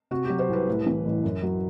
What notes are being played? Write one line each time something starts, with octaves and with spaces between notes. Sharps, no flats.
C3 F#4
G4
F#3
C5
C2 B4
A2
E3
A1
F#2
F#3